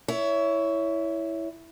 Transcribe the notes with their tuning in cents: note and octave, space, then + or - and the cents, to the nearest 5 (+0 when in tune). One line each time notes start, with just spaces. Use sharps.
E4 +0 C#5 +20